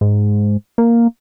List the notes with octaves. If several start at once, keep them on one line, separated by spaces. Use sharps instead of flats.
G#2
A#3